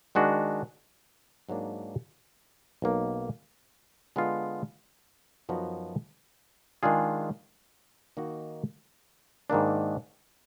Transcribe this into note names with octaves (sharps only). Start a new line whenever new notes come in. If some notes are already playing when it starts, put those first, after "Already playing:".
D#3 G#3 D4 F#4
G#2 F#3 A#3 D4
B1 B2 A#3
D3 G#3 B3 F4
F#2 F3 B3 D#4 F#4
D#3 G#3 D4 F4 G#4
D#3 A#3 D#4 F#4
G#2 D#3 A#3 D4